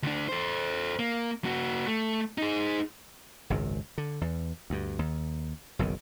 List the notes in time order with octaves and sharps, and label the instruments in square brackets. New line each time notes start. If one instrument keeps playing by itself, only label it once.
[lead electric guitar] D2 D4
A4 C5
A#3
A#3 F#4
A3
D#4 G#4
[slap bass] G#1 C#2 F#2
D3
E2
D2 G2
D#2
F#1 B1 F#2 D#3